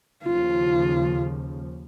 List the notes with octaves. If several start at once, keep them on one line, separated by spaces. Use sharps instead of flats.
D#2 C#3 F3 F4